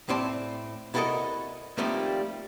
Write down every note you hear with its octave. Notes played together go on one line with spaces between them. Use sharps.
A2 C4 D5 A5
C2 E4 F#4 A4 A#4 D#5
D#3 F3 G3 A3 A#3 C4